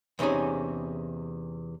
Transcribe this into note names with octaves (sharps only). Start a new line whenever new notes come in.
E2 C3 C#4 D#4 G#4